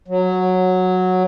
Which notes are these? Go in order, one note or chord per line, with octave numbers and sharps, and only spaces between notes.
F#3